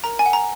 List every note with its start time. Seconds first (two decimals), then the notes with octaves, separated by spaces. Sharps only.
0.04 A#4 A#5
0.19 G#5
0.26 F#5
0.33 A#5